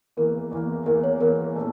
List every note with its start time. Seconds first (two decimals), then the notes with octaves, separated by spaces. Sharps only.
0.17 E2 E3 A#3 A#4
0.52 E2 E3 A#3
0.86 E2 E3 A#3 A#4
1.04 C#5
1.20 E2 E3 A#3 A#4
1.55 A#2 A3 C#4